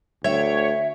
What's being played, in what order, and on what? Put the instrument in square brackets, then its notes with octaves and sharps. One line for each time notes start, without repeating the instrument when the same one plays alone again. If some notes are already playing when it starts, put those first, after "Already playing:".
[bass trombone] D2 [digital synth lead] C#5 [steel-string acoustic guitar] E5 G5